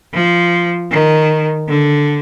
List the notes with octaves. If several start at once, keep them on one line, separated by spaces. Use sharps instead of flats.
F3
D#3
D3